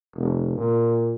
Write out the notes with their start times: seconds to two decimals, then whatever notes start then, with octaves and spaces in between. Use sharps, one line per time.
0.16 F1
0.57 A#2